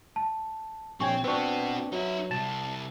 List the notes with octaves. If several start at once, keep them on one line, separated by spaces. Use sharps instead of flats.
A5
A#1 C4 C#5 G5 G#5 C#6
B3 C4 D4 F#4 B4 C#6
F#3 D#4 E5
C2 C3 A5